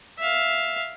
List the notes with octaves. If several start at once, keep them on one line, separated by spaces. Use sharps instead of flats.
E5 F5